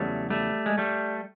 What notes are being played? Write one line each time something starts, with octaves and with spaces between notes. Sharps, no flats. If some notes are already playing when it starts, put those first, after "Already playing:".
Already playing: E2 C#3 F#3 G3 A3
G3 A3
G#3
G3 A3